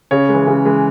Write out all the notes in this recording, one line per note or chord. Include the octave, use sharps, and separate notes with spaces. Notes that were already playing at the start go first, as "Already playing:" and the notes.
C#3 C#5
G#3
E3
C#3
E3 G#3